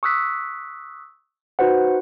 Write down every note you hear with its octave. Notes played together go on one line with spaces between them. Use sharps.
C#6 D#6 E6 F#6 B6
D#4 F#4 B4 C5 F#5